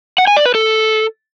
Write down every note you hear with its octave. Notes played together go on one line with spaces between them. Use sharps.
F#5
G#5
D5
B4
A4